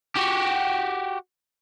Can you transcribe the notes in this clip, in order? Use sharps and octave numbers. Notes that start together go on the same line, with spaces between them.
F#4 G4